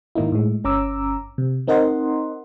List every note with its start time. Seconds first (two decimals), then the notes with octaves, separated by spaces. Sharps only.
0.15 G#2 D#3 A#3 D#4 E4
0.32 A2 G#3
0.64 G1 C#4 A#5 D6 E6
1.38 C3
1.67 C4 D#4 A#4 D#5 F#5 C6